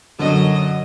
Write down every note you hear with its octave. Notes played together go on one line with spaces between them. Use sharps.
F#2 D3 F#3 D#5